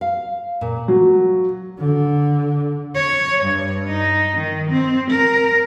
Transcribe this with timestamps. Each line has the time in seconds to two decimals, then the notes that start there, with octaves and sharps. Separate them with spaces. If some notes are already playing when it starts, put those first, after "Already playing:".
0.01 F5
0.61 A#2
0.88 F#3
1.79 D3
2.95 C#5
3.44 G2
3.87 D#4
4.37 D#3
4.70 C4
5.10 A#4